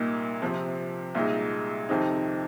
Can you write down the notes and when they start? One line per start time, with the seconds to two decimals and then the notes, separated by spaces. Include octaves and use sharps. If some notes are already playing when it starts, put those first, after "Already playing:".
Already playing: C2 A#2 A#3 D#4
0.42 C3 F3 C4
1.15 C2 A#2 G#3 D#4
1.89 F2 C3 D#3 C4 D#4